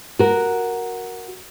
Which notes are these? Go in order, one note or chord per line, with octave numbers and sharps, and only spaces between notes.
F#4 A#4